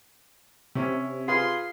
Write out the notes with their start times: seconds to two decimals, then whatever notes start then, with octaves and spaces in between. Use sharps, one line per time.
0.75 C3 C#4 E4
1.28 F4 G#4 B4 C6